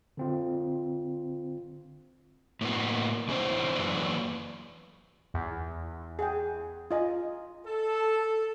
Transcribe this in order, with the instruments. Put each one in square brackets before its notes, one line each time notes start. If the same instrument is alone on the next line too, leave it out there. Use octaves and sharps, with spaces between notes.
[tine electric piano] D3 C4 F4
[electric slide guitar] A2 A#3 B3 F#4
E2 E3 G#3 C4 D4 C5
F#2 E3 F#3 A#3 B4 D5
[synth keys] E2
[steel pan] G#4 F#5 G5
F4 D#5 G#5
[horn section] A4